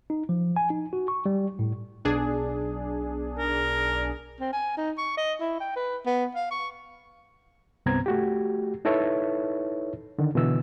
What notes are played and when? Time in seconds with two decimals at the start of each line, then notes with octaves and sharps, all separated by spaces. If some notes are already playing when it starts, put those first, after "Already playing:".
0.10 D#4
0.29 F3
0.56 G#5
0.70 D#4
0.93 F#4
1.08 C#6
1.26 G3
1.59 A2
2.05 B1 D4 G#4
3.38 A#4
4.40 C4
4.53 G#5
4.77 D#4
4.98 C#6
5.17 D#5
5.40 E4
5.60 G5
5.76 B4
6.06 B3
6.35 F5
6.51 C#6
7.86 C2 G2 B3 C4 A#5 G#6
8.06 A3 F#4 G4
8.85 D#4 E4 A4 B4 C#5 E5
10.19 D3 D#3
10.35 B2 D3 E3 E6